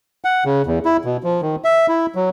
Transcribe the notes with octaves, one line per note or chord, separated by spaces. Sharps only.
F#5
C#3
E2
E4
B2
F3
D#3
E5
E4
F#3